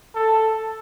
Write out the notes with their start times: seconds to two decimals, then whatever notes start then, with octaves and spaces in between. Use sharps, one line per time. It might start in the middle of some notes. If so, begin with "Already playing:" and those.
0.15 A4